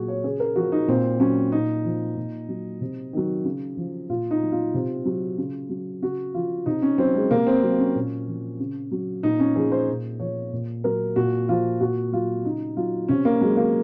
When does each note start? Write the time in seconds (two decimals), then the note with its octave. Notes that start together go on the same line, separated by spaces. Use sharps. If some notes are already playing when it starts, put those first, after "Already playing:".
Already playing: A#2 F#3 F#4 G#4
0.08 C#5
0.24 C#3 G#4
0.40 A#4
0.56 F3 F#4
0.72 D#4
0.88 A#2 C4
1.20 F#3 C#4
1.52 A#2 D#4
1.85 F3
2.16 A#2
2.49 F#3
2.81 C3
3.13 D#3 F#3
3.45 C#3
3.77 F3
4.09 A#2 F4
4.31 D#4
4.42 F#3
4.52 F4
4.74 C3
5.05 F#3
5.38 C#3
5.70 F#3
6.02 C#3 F#4
6.34 F3 F4
6.66 C3 D#4
6.82 C#4
6.98 F#3 C4
7.15 G#3
7.31 C3 A#3
7.47 C4
7.63 F#3
7.79 C#4
7.95 A#2
8.28 F3
8.60 C#3
8.91 F#3
9.23 A#2 D#4
9.40 C#4
9.55 F3 G#4
9.72 C5
9.87 A#2
10.20 F3 C#5
10.53 A#2
10.84 F#3 A#4
11.16 A#2 F#4
11.49 F3 F4
11.80 A#2 F#4
12.12 F#3 F4
12.45 C#3 D#4
12.77 F#3 F4
13.08 C3 C#4
13.25 A#3
13.41 F#3 G#3
13.57 A#3